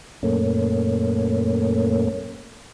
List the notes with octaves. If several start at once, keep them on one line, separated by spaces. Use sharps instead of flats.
F#2 A#2 A3 A#3 C#4